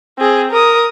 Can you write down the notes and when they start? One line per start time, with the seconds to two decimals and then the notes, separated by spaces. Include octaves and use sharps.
0.19 C4 G#4
0.51 A#4 D#6